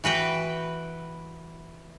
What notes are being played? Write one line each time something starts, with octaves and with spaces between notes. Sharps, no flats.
E3 F#4 B4 G5